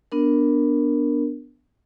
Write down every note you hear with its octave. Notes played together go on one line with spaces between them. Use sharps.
B3 D4 A#4